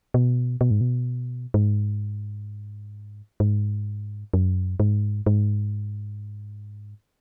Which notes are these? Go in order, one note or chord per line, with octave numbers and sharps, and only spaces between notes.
B2
B2
G#2
B2
G#2
G#2
F#2
G#2
G#2